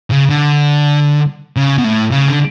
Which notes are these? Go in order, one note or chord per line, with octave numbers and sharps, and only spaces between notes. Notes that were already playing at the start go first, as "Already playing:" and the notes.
C#3
D3
C#3
B2
A2
C#3
D3